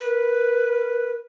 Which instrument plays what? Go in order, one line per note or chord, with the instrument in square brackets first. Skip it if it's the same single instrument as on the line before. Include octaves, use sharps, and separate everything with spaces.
[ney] A#4 [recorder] B4